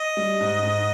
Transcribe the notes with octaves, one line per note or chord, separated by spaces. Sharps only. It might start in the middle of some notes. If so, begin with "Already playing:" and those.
Already playing: D#5
G3
G#2
G#2